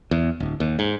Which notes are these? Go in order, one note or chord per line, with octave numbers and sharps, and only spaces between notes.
E2
D1
D#2
G#2